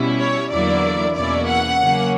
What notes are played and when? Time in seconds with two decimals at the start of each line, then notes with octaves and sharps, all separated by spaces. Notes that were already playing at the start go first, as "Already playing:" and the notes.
Already playing: B2 G3 C#4 E4
0.19 C#5
0.50 E2 D3 F#3 A#3 E4 D5
1.15 E2 B2 A#3 C#4 E4 D5
1.47 F#5
1.80 C#3 F#3 A#3 C#4